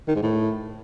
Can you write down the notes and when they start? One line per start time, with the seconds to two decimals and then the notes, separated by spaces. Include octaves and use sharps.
0.08 D#3
0.15 G#2
0.23 A2